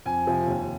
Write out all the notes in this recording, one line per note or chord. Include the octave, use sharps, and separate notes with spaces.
F2 G#5
C3 F3
D#2